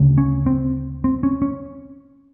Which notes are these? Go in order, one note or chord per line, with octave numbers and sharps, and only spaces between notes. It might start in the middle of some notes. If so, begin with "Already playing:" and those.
Already playing: D2 C#3
C#4
C4
C4
C#4
C#4